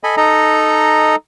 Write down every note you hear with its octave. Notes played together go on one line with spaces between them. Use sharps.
A4 D#5 G#5 B5
D#4 A4 D#5 A#5